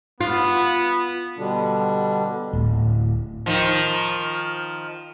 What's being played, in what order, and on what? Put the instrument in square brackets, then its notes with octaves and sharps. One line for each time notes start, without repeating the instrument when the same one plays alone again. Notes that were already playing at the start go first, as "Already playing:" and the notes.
[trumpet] B3 [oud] F4
[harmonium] B2 D3 G3 D4
[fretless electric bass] D1
[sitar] D#3 F3